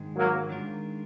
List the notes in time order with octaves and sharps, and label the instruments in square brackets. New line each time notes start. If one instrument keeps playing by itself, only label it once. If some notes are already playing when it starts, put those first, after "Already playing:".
Already playing: [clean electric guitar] G#2 D#3 G#3
[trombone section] F#3 A#3
[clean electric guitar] D#3 G#3 D4 F4 A#4